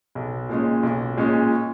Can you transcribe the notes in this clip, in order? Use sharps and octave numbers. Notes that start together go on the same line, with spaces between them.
B1
A#2 G#3 C#4
B1
A#2 G#3 C#4